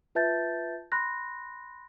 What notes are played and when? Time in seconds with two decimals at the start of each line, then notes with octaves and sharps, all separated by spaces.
0.15 F4 B4 E5 A5 G6 A6
0.92 B5 C6 F#6 A#6